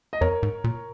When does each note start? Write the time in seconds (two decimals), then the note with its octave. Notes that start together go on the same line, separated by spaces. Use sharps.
0.13 D#5
0.21 F2 A#4 C#5
0.43 G#2
0.64 A#2